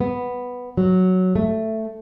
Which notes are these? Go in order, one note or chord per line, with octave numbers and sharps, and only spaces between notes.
B3
F#3
A3